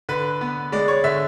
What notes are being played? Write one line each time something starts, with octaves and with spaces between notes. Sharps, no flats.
D3 B4
B3
G#3 D5
C#5
D3 E5